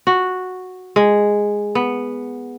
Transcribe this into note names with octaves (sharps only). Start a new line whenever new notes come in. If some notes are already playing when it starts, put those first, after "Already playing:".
F#4
G#3
B3